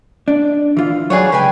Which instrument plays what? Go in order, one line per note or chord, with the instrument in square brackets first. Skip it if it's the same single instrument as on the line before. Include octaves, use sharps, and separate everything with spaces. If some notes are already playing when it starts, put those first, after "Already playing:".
[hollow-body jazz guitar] D4
E3 F4
[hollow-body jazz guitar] F#3 F4 D5 [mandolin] G#4 B4 C#5
[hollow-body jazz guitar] C#2 [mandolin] B4 G5 G#5